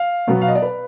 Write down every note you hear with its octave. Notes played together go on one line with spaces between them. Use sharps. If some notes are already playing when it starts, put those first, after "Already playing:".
Already playing: F5
B2 F#3 B3
F5
D#5
D5
B4